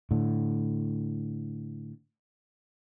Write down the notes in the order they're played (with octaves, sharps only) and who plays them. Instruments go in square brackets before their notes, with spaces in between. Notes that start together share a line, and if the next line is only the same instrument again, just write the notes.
[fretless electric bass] A2 D3